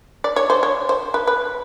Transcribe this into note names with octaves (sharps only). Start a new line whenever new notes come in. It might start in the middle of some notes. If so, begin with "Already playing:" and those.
D5
C#5
C5
C#5
C5
B4
B4